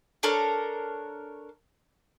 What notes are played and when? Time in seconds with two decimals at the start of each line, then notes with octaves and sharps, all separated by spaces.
0.23 D4 A4 A#4 C#5